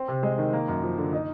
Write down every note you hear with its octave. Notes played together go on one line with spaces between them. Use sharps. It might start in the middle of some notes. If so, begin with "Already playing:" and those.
Already playing: C4
C3
G#3
D#3
A#3
F#2
F3
D3
D#4